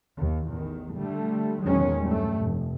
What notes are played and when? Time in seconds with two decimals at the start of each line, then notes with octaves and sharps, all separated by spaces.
0.17 D#2
0.52 A1 E2 D#3
1.00 D3 G3 A3
1.63 E2 A#2 D#3 F#3 G#3 C#4
2.03 G2 G3 A3
2.39 F1